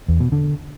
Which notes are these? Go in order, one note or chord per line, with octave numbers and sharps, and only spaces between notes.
E2
B2
D3